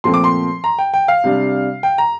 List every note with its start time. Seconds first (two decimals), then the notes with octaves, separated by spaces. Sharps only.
0.04 A#2 F3 A3 C4 C6
0.14 D6
0.24 C6
0.64 A#5
0.79 G5
0.94 G5
1.08 F5
1.24 C3 G3 D4
1.83 G5
1.98 A#5